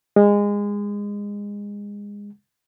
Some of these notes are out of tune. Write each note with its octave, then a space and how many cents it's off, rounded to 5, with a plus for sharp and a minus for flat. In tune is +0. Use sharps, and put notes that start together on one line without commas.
G#3 -25